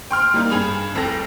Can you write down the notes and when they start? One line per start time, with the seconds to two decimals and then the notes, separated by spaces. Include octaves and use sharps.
0.11 G5 C6 F6
0.34 G3 A#3 D#4
0.50 G2 G#4 B5 F7
0.95 F1 C2 A4 A#6